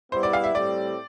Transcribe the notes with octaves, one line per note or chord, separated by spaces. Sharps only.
G3 B3 E4 G4 C5
D5
F5
E5
A2 G3 C4 G4 D5